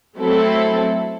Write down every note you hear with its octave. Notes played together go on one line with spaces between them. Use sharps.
F#3 A3 C4 E4 A4